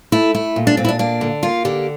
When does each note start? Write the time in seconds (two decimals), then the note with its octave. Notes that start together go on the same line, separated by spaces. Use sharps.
0.12 A3 E4
0.34 A3 E4
0.56 A#2
0.67 D4
0.77 A#2 C4
0.85 E4
0.89 D4
0.99 A#3 D4
1.21 D3
1.43 A#3 F4
1.65 D3 G4